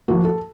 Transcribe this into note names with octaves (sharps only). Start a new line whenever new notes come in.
F3 A#3 F#4
A4